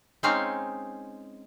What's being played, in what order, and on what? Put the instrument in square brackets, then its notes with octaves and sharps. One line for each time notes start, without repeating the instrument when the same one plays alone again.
[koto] G#3 C4 C#4 D#4 F5